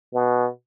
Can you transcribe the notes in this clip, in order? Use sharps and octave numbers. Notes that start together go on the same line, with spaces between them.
B2